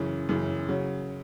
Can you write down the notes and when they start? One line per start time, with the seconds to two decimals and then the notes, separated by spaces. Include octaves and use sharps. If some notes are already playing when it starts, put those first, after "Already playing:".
Already playing: F#2 C#3 E3
0.29 F#2 C#3 E3
0.69 C#3 F#3